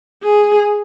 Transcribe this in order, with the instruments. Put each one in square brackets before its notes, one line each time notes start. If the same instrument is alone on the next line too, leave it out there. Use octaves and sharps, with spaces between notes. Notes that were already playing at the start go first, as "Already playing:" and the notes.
[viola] G#4